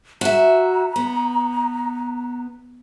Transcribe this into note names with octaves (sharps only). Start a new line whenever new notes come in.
F#4 E5 A#5
B3